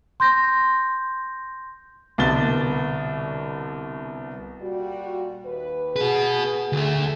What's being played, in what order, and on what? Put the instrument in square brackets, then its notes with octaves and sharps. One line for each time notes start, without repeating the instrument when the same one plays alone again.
[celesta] C6 G6 A#6
[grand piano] C2 B2 D3 B3 A6 G7
[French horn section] A#2 G3 F#4
D#2 B4
[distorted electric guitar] F#4 B4 [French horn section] G#4
[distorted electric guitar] D2 A3